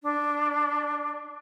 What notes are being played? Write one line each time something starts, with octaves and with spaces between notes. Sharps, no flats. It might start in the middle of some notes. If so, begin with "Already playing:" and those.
D4